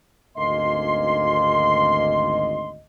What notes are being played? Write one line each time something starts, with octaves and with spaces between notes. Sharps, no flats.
G#1 D2 A#3 C#4 D#5 C6